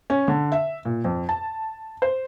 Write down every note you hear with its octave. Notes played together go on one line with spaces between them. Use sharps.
C#4
D3
E5
A#2
F2
A5
C5